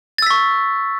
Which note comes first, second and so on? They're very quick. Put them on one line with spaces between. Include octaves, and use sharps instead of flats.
A6 E6 B6 C#6